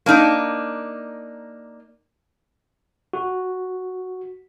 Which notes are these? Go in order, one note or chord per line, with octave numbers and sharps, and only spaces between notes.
A#3 D4 D#4
F#4